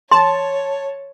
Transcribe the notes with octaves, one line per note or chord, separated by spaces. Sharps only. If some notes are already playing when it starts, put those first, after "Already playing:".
C#5 A5 C6